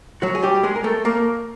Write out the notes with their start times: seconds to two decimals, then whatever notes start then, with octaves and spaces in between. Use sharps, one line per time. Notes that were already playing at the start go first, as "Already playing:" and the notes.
0.22 F#3 F#4
0.35 G#4
0.42 G3 G4
0.63 G#3 G#4
0.76 A#4
0.84 A3 A4
1.05 A#3 A#4